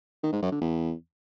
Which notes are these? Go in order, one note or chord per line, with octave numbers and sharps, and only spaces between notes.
D#3
G#2
F#2
D3
E2